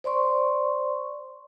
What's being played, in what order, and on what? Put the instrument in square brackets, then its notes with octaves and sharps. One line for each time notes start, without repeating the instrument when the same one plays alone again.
[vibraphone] C5 D5 C6 C#6